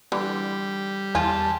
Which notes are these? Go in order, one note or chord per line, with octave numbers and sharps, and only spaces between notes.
D3 E3 G3
E2 F4 G#5 A5